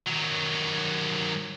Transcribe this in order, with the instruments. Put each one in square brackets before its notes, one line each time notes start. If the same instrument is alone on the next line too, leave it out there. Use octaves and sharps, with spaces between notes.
[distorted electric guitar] D#3 F#3